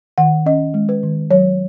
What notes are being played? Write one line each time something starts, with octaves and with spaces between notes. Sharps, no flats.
D#3 F#5
C#4 D#5
G#3
B4
D#3
F#3 C#5